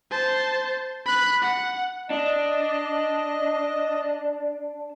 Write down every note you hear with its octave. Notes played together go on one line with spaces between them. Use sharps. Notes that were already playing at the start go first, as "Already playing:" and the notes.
C5 A5
B5 F#6
F#5
D4 D#5